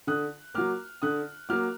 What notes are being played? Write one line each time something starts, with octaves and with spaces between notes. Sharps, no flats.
D3 D#6 F#6
F#3 A#3 D6 F6
D3 D#6 F#6
F#3 A#3 D6 F6